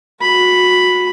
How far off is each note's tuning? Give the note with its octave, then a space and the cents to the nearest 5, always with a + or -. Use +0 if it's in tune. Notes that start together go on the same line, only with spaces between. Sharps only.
F#4 -30 B5 +0